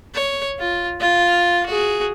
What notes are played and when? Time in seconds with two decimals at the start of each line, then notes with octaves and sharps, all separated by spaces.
0.14 C#5
0.59 F4
1.00 F4 F5
1.66 F#4 G#4